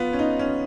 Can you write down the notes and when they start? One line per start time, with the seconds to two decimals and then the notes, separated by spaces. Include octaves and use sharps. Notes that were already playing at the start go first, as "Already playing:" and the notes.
Already playing: B3 F4
0.13 C#4
0.19 D#4
0.39 C#4